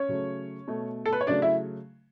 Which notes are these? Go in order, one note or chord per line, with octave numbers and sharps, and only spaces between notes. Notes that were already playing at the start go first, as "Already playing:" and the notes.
Already playing: C#4 C#5
C#3 F#3 A3
B2 A3
A4
B4
C#5
C#3 F#3 A3 D4 D5
E4 E5